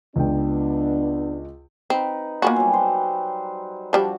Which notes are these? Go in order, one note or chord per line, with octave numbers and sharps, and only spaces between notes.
C#2 B3 D4 G5
C4 D#4 B4
A#3 B3 F4 F#4 B4 G#5
F#3 G3
C5
F3 G3 D4 F#4 D5